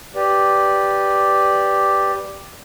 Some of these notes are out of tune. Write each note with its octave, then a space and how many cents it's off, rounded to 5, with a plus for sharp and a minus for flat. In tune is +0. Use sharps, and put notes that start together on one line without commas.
G4 +0 B4 +0 D5 +0